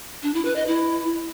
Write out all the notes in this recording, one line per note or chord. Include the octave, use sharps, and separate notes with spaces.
D4
E4
B4
D#5
E4